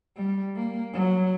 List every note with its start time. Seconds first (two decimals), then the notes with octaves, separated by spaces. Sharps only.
0.16 G3
0.56 A#3
0.93 F#3